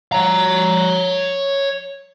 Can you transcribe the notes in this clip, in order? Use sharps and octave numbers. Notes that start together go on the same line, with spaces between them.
C#5 A#5